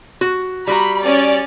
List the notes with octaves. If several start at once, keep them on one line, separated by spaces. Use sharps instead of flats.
F#4
G3 F#4 A#5 B5
C#4 D5